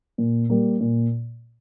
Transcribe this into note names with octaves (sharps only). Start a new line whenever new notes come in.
A#2
G3 A#3
A#2